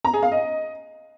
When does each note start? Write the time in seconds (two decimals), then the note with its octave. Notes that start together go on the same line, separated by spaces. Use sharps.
0.05 A#5
0.14 G#4
0.23 F5
0.32 D#5